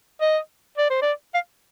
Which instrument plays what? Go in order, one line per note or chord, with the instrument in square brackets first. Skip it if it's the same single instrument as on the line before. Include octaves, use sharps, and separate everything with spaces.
[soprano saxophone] D#5
D5
C5
D5
F5